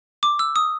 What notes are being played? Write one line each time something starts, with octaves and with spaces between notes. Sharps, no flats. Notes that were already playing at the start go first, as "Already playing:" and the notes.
D6
E6
D#6